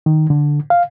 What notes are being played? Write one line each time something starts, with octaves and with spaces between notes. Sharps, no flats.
D#3
D3
F5